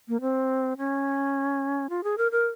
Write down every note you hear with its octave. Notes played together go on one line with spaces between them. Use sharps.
A#3
C4
C#4
F4
G#4
A#4
A#4